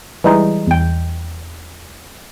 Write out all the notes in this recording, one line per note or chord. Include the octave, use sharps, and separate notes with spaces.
E3 G3 G#3 D#4
E2 G5